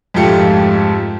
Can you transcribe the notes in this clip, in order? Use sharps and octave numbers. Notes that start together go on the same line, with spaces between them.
F2 G#2 A3 F4 G4 C#7